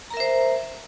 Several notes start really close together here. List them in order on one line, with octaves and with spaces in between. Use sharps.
A#5 A#4 E5 C5